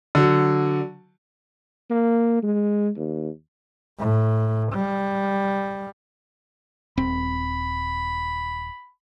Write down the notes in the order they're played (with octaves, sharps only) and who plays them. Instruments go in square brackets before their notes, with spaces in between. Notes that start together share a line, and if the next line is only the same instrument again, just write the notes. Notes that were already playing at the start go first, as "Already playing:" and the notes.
[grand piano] D3 F#3
[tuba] A#3
G#3
D#2
[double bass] A2
G3
[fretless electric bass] D#1 C4 [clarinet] B5